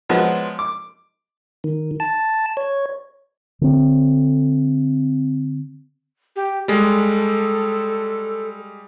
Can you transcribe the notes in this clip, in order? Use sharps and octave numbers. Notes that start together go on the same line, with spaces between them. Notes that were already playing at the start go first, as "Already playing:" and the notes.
F3 F#3 G#3 B3 F#4
D6
D#3
A5
C#5
D3 C4
G4
G3 G#3 A4